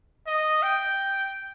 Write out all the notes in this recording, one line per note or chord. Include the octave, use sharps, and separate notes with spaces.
D#5
G5